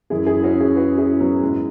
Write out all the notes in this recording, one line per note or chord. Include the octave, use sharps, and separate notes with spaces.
F#2 E3 E4 G#4
E4 G#4
C#4 F#4
E4 G#4
F#4 B4
E4 G#4
F#3 B3
G#2 E3 G#3